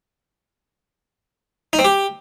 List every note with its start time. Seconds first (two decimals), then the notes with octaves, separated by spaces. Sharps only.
1.73 D#4
1.79 C4
1.85 G4